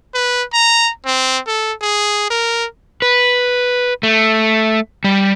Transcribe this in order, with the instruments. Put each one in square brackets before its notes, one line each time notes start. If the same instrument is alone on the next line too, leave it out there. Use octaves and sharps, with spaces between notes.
[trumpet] B4
A#5
C4
A4
G#4
A#4
[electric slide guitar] B4
A3
G3